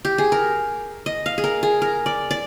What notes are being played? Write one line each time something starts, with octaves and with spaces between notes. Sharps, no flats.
G4
G#4
A#4
D#5
F5
G#4
A#4
G#4
A#4
D5
D5